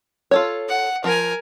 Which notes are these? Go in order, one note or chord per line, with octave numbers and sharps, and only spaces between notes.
F4 A4 C#5
F#5
F3 A#4 G#5